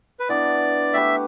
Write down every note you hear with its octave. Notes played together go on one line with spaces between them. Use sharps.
B4
E3 B3 D4 D5
A3 G4 B4 E5